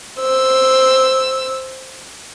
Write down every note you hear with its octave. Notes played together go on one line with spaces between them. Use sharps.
C5 E6